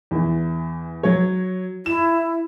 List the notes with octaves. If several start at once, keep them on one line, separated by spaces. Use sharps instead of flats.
E2 E3
F#3 C#5
E4 E7